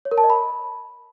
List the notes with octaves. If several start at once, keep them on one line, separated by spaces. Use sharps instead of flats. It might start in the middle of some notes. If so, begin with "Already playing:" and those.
C#5
A#4
A5
D#5
B5